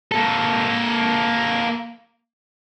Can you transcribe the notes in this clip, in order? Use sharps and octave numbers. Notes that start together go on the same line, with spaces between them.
A#3 A4